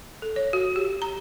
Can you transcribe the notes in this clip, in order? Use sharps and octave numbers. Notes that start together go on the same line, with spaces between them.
A4
C#5
F#4
G4
A#5